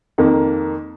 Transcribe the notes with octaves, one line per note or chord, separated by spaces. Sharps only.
F2 D#3 A#3